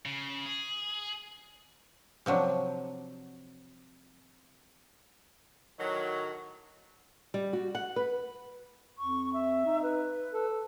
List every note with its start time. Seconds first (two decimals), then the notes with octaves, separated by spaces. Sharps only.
0.06 C#3
0.46 G#4
2.26 C3 F3 F#3 D4
5.79 A2 D#3 F#3
7.34 G3
7.53 F#4
7.75 F#5
7.96 B4
8.98 F2 C#6
9.33 E5
9.65 D#4
9.83 B4
10.33 A4